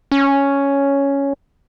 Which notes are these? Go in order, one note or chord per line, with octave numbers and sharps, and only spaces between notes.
C#4